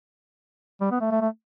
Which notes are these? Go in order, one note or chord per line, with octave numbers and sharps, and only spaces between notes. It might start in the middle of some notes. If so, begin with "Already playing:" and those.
G3
B3
A3
A3
A3